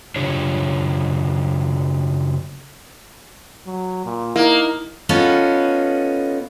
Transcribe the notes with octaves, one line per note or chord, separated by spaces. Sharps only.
F#2 C#3 D4 F4 G4 C#5
F#3
A#2
A#3 D#4 E4
B3 C#4 D#4 F4 A4